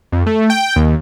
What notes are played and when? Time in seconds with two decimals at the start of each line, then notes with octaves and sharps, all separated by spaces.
0.12 F2
0.26 A3
0.50 G5
0.76 D#2